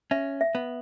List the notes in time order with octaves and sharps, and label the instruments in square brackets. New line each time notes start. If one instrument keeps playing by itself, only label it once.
[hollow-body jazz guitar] C#4 [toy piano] E5
[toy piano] E5
[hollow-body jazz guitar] B3